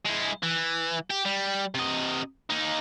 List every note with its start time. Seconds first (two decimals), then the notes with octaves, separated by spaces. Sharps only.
0.06 G#3 E4
0.43 E3
1.11 G4
1.26 G3
1.75 C3 D#5
2.50 A#3 D#4